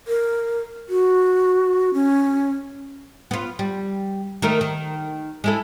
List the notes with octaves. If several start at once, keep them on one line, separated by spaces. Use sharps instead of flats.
A#4
F#4
C#4
B3 F4
G3
D#3 A3 A#4
D#3
G#3 E4 A4